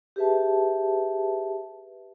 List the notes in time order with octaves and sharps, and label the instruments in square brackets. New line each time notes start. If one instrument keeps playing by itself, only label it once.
[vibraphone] G4 G#4 B4 E5 A5